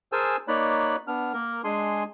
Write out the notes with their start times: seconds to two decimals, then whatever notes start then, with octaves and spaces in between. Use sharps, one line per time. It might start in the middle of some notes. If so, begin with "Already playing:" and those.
0.12 G#4 A#4 C5 G#5 A5 E6
0.48 A#3 D#4 C#5 D5 B5 F#6
1.08 B3 D4 F6
1.34 A#3 A#4
1.64 G#3 D4 G#4 G#5 C6